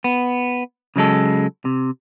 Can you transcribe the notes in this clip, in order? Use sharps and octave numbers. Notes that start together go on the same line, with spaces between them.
B3
C#3 F#3 G#3 A4
C3